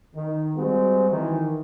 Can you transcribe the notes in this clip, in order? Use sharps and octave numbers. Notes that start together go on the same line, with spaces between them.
D#3
G3 G#3 C4 F#4
D#3 E3